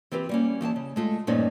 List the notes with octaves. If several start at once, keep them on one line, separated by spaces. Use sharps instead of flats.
E3 C4 F4 G4 B4
G3 A#3 C#4
D#2 E3 G5 A5
C#3
G#3 A3 F4
G2 A#2 F3 A3 C#4 D#4